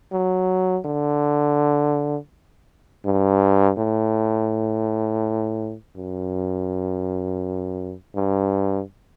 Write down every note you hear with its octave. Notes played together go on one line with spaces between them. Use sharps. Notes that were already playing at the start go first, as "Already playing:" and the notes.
F#3
D3
G2
A2
F#2
G2